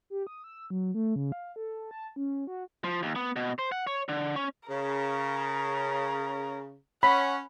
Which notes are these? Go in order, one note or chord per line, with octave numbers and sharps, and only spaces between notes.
G4
D#6
E6
F#3
A3
C#3
F5
A4
A5
C#4
F#4
F3
D#2
B3
B2
C5
F#5
C#5
D3
C#4
C#3 A#4
C#4 F#5 B5